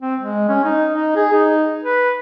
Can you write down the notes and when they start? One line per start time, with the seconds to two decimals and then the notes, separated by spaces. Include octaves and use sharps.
0.01 C4
0.20 G#3
0.48 C#4
0.64 D#4
0.92 D#4
1.16 G#4
1.33 D#4
1.82 B4